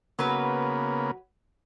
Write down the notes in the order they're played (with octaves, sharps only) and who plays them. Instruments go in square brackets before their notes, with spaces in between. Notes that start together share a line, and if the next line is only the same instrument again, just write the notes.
[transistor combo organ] C#3 A#3 B3 [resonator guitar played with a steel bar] F#3 B4